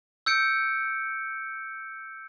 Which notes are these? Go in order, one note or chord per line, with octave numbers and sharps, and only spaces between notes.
E6 G6 C#7 D7